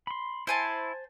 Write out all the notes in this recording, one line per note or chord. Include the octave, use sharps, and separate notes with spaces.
B5 C6
E4 C5 G#5 A5